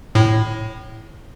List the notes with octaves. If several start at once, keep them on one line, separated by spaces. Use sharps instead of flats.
A2